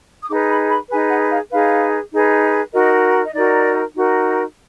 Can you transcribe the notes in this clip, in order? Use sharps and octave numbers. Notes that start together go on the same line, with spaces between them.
D#6
D#4 G#4 B4 D6
B5
B5
D#4 G#4 B4 G#5
F#5
F5
D#4 G#4 B4 F5
D#4 G#4 B4
D#4 F#4 A#4 D#5
D#5
D#4 F#4 A#4 D5
D#4 F#4 A#4